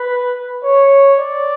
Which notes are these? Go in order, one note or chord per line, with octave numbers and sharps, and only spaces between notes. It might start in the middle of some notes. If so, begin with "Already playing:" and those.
Already playing: B4
C#5
D5